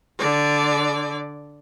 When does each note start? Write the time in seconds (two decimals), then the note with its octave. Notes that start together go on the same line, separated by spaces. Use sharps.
0.19 D3 D5